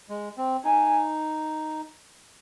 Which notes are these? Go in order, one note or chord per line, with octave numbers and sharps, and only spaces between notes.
G#3
C4
D#4 G#5